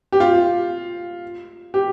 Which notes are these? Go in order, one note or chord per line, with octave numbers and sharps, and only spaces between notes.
G4
F4
G4